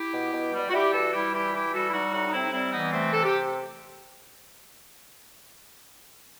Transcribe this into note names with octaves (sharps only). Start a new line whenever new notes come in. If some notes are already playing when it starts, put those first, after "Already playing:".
Already playing: E4 G4
B2
B2
G3
F#4
G3 E4 G4
E3 F#4 A4
G3 E4 G4
E3 E4 G4
E3 E4 G4
G3 F#4 A4
E4
G3 D#4 F#4
A2 D#4 F#4
D#4
C3 C4 E4
D#4
G3 C4 E4
E3 B3 D#4
C3 A3 C4
C3 A4
G4